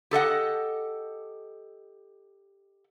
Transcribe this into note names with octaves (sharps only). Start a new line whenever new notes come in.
G4 A4 D#5 F#5